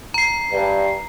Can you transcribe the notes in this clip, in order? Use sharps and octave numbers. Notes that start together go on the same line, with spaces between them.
A#5 C7
G2